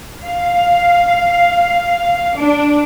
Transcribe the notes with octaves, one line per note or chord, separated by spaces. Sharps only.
F5
D4